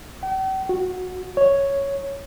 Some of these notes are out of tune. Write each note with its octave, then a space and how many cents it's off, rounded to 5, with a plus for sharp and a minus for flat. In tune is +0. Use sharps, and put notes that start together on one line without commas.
G5 -45
F#4 -15
C#5 +0